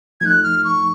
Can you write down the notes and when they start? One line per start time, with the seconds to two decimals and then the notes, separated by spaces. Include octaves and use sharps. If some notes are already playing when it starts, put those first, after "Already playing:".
0.21 F3 A3 D#4 F#6 G#6
0.43 F6
0.64 C#6